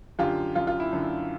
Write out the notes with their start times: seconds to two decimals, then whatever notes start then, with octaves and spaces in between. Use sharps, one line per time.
0.19 F#2 D3 F4 G4
0.55 F#2 D3 F4
0.67 F4
0.80 E4
0.93 F#2 D3